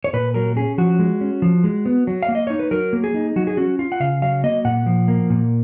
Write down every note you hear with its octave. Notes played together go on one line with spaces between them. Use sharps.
C#5
A#2 B4
F#3 A#4
C#4 G#4
F3 F#4
G#3
C#4
F3
G#3
B3
F#3
F5
A#3
D#5
D#4 C#5
B4
F#3 A#4
A#3
G#4
D#4
F#3 F#4
G#4
C#4 F#4
F4
F#5
C#3 F5
F#3 F5
A#3 D#5
A#2 F#5
F3
A#3
A#2